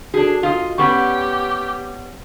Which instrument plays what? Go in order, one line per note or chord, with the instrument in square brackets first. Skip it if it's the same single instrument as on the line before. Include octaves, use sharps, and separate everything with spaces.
[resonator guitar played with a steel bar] D4 G#4 [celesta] F#4 A4
[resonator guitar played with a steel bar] F4 D#5
[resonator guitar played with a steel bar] G3 B3 C#4 [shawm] G4 [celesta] C#6